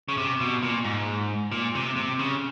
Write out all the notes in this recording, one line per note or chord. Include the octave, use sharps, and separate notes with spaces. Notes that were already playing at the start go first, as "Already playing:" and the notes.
C#3
C3
B2
A#2
G#2
A#2
C3
C3
C#3